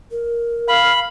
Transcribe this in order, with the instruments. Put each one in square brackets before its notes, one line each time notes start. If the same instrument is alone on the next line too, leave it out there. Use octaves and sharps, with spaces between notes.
[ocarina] A#4
[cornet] F5 [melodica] B5